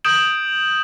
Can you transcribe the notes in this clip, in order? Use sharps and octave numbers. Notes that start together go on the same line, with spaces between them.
D#6 G6 G#6 D7 E7 F#7